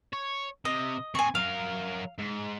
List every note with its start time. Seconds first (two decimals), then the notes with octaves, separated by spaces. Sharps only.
0.13 C#5
0.65 C3 D#5
1.15 C4 G#4 G#5 C#6
1.35 F#3 A#4 F5
2.18 G#2